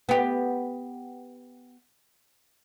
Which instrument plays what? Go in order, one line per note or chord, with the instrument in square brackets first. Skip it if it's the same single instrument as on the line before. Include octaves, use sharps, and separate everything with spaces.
[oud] B3 G4